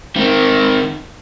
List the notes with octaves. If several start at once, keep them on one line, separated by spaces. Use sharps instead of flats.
D#3 C4